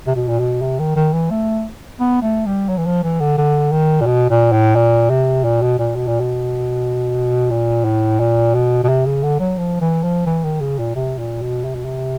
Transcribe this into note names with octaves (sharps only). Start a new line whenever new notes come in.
C3
B2
A#2
B2
C3
D#3
D#3
E3
A3
B3
A3
G3
F#3
E3
F3
E3
D3
D3
D#3
A#2
B2
A#2
A2
A#2
C3
A#2
B2
A#2
B2
A#2
B2
A#2
A2
A#2
B2
B2
C3
C#3
D3
F#3
F3
E3
F3
E3
D#3
C#3
A#2
C3
A#2
B2
C3
B2
C3